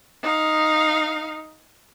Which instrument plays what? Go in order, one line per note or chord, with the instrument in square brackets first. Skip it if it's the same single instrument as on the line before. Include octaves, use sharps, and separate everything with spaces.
[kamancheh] D#4 F5